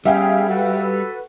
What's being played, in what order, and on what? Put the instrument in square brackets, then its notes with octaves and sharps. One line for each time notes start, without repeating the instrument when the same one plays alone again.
[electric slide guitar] G3 [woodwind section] B3 C#4 G#4 [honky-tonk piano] E5 F5 G5
[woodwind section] F#4 A4 B4